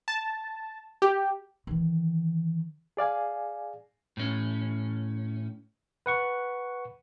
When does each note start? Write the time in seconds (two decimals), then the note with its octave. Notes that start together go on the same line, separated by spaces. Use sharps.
0.08 A5
1.02 G4
1.67 D#3 E3
2.97 G#4 D5 F5 G#5
4.17 A2 C#4
6.06 B4 F#5 C#6